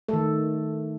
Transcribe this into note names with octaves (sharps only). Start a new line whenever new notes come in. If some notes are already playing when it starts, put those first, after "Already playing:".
D#3 A3 A4